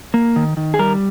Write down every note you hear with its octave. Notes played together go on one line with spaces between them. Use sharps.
A#3
D#3
D#3
G#4
G3 A#4